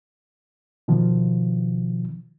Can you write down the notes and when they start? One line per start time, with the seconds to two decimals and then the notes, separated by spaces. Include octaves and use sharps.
0.88 B2 D#3 F3